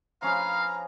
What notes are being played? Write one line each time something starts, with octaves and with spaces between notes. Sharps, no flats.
F3 C#4 B4 F5 A#5